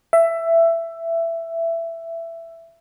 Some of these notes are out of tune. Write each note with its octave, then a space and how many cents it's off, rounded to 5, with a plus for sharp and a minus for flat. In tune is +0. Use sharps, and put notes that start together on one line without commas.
E5 +15